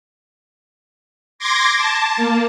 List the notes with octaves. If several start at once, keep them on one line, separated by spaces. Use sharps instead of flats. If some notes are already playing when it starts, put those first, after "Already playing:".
C6 D6 G#6 A#6
A5
A#3